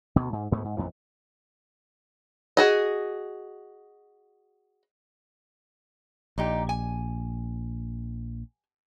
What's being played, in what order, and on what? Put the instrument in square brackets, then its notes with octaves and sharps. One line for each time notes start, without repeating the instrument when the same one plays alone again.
[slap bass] D2 B2
G#2
D2 G#2 A3 B3
G#2
A1 F2 A#2 E3
[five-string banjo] F#4 G#4 D#5
[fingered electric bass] A#1 [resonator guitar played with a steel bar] A#2 D#4 G4
[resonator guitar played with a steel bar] G#5